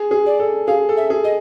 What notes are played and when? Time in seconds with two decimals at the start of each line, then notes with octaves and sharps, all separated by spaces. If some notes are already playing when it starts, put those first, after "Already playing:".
Already playing: G#4
0.11 G#4
0.26 D5
0.39 A4
0.67 G#4 F5
0.89 A4
0.97 E5
1.10 G#4
1.24 D#5